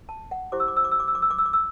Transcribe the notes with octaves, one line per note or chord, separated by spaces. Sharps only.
A5
F#5
E4 G4 C5 D6
E6
D6
E6
D6
E6
D6
E6
D6
E6
D6
E6
D6
E6